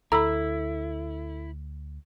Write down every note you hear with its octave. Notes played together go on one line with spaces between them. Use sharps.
D2 E4 A4 A#5 B5 E6